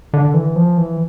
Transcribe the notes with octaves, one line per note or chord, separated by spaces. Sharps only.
D3
E3
F3
E3